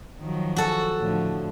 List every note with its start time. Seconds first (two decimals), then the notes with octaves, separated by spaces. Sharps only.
0.19 D#3 F3 F#3
0.56 F#4 A4
1.00 A2 D3 F3